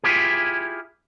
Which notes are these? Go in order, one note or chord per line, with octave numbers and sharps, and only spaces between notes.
E4 F4 G4 G#4